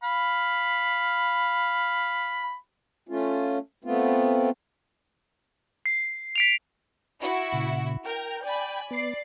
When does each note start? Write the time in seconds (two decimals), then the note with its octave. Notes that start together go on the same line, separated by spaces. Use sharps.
0.03 F5 B5
3.09 A3 C#4 F4
3.85 A3 B3 C4 F4
5.86 C7
6.36 B6 D7 F7
7.21 E4 F#4
7.53 A#2 C#3
8.06 A#4 G5
8.44 D5 G#5 B5
8.91 B3 D5 C7